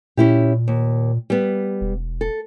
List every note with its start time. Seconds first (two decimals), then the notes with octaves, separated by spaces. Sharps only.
0.17 A#2 C#4 E4 G4
0.68 D#2
1.30 G3 B3
1.81 E1
2.21 A4